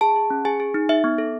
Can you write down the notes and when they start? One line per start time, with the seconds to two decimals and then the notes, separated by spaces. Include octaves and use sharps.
0.01 G#4 A5
0.16 G#4
0.30 C#4
0.45 G#4 G#5
0.60 G#4
0.74 D#4
0.89 D#4 E5
1.04 B3
1.18 A4